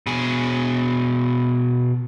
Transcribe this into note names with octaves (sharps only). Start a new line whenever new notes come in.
B2 G#4